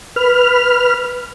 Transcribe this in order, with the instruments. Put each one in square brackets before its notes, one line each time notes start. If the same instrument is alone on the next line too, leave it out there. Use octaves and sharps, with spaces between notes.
[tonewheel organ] B4 F6